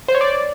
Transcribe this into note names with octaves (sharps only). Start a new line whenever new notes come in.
C5
C#5
D5